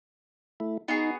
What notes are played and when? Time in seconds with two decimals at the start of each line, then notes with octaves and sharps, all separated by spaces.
0.60 A3 E4
0.88 B3 D#4 F#4 G#4